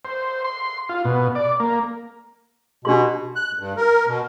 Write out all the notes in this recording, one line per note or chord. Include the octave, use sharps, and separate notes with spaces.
C5
C6
F4
B2
D5
A#3
B2 D4 G4 C6
F#6
G2
A#4
B2